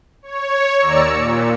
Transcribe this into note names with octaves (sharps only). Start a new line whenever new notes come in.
C#5
D#2 D5 A#5 E6 C#7
A#2